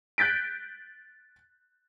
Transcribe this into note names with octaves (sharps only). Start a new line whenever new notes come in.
F#6 G6 A6 B6 D7